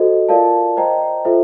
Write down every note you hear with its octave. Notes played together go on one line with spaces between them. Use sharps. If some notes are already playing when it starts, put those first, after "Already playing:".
Already playing: F#4 A4 C5 D#5
F4 A#4 D5 F5 A5
C5 D#5 G5 A#5
F4 A4 C5 E5